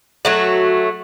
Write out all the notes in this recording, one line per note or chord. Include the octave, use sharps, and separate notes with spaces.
F#3 A3 F#4